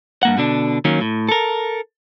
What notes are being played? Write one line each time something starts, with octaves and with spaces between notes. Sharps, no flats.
G2 A#3 F#5
B2 D3 D4
D#3 F#3 A#3 C#4
A2
A4 A#4